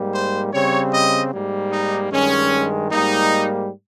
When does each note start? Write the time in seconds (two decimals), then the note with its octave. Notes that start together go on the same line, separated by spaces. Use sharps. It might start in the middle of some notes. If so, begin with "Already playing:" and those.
Already playing: G#2 G3 A#3
0.13 C5
0.53 C#3 G3 C4 C#5
0.93 D#5
1.32 G#2 G3 A#3
1.72 D#4
2.11 G2 D#3 G#3 C#4
2.91 G#2 G3 A#3 D#4